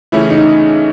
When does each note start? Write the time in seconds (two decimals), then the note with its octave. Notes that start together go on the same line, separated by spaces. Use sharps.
0.12 C#3 E3 A3 C#4 E4 G#4
0.30 D#4